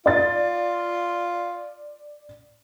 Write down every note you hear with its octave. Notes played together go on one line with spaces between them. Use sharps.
F4 D5 A6